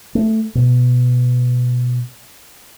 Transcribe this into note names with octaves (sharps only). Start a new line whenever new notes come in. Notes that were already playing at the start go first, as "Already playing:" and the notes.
A3
B2